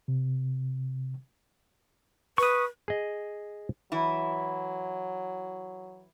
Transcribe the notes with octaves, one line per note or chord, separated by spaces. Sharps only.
C3
B4 C#6 D#6
G#4 D#5
E3 F#3 E4